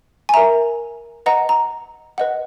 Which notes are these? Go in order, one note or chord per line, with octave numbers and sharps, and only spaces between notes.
G#5
A#4 E5 A#5
B4 D#5 F#5 A#5
A#5
B4 D#5 F#5